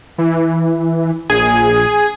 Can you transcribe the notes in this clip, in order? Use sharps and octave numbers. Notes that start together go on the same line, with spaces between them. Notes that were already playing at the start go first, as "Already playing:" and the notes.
E3
A#1 G#4